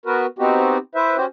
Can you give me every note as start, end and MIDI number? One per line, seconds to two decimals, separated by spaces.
0.06 0.26 59
0.06 0.26 66
0.06 0.26 70
0.06 0.26 71
0.39 0.78 59
0.39 0.78 60
0.39 0.78 63
0.39 0.78 66
0.39 0.78 67
0.95 1.17 64
0.95 1.17 71
0.95 1.17 72
0.95 1.17 76
1.17 1.25 61
1.17 1.25 66
1.17 1.25 67
1.17 1.25 72